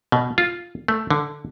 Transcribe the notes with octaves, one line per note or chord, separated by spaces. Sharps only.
B2
F4
A3
D3